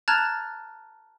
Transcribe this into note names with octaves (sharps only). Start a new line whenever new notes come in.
A5 A#5 F6 F#6 G#6 A6